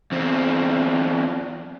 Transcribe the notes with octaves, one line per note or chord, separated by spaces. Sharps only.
E2 C4